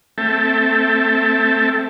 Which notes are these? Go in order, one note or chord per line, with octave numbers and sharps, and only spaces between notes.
A3 C4 A4 E5 G5 A5